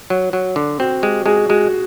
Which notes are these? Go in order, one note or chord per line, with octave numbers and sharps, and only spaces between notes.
F#3
F#3
D3
C4 F#4
G#3 G4
G#3 F#4 G#4
G#3 F#4 G#4